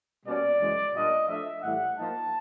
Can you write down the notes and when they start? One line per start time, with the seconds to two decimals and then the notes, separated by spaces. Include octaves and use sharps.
0.26 B2 G3 A#3 C#4 D5
0.60 F#2 C#3 E3 G#3
0.94 A#2 G3 A#3 D4 F4 D#5
1.28 F3 A3 D4 E5
1.62 A2 E3 G3 F#5
1.96 F3 A#3 D#4 A5